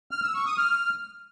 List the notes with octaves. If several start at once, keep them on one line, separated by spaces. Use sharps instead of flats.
F6
E6
C#6
D#6
F6